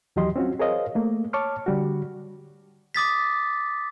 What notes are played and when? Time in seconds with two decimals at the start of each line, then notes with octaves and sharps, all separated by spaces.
0.16 D#2 E3 F#3 G4 D#5 C6
0.36 C4 C#4 F4 F#4
0.60 G#4 A#4 C5 C#5 D#5 F5
0.95 A3 A#3
1.33 C#5 A5 C#6 D6 F6
1.66 D3 G3 F#4
2.95 D6 D#6 A6 B6